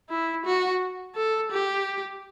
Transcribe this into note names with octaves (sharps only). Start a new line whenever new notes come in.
E4
F#4
A4
G4